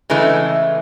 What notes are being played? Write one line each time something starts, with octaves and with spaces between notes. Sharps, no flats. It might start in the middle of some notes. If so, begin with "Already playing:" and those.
C#3 E3 G#3 A3